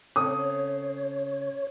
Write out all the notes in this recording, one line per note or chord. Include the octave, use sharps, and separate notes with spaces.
C#3 C4 A4 C#5 D#6